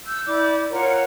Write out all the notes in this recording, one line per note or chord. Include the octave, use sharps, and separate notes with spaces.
E6 G6
E4 D5 D6 G6
F4 A#4 C#5 F#5